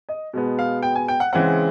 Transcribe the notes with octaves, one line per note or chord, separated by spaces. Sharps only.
D#5
B2 G#3 B3
F5
G5
G#5
G5
F#5
C#3 E3 G#3 C4 F#5